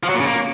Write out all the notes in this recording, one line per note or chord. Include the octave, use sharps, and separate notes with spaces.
F3
F#3
A#2
C#3
A#3